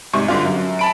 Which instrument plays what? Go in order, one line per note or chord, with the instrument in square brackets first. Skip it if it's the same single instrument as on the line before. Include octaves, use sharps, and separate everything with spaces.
[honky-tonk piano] G#2 C3 G3 C#6
G2 D3 F4
F#2
A5 B5 D7